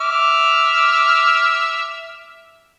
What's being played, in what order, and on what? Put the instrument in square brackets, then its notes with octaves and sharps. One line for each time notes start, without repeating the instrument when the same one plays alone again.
[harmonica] E5 D6 F6